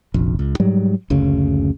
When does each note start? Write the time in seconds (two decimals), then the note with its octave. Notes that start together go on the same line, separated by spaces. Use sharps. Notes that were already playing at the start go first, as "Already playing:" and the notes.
0.14 F1 A#1
0.39 C#2
0.60 G#2 F#3 G3
1.10 F#1 D2 C#3